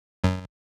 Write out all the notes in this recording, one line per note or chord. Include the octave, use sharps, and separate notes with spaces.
F#2